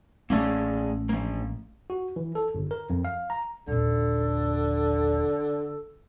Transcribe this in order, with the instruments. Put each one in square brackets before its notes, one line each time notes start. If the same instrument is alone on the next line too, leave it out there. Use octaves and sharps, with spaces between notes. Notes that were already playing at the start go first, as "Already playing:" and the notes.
[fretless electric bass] A1 A3 C#4 [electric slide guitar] A#3 G#4 D5
[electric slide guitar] F3 A#3
[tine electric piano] F#4
E3
A4
G1
A#4
F2
F5
A#5
[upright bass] D#1 A#1 [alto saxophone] D3 [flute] A4